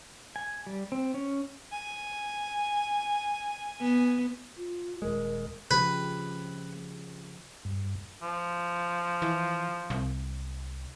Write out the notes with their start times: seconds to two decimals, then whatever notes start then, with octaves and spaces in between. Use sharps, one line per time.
0.36 G#5
0.67 G3
0.92 C4
1.14 C#4
1.72 G#5
3.81 B3
4.58 F4
5.02 D#1 G#3 A#4
5.71 C#3 F3 G4 B4
7.65 G2
8.22 F3
9.22 E3
9.90 C2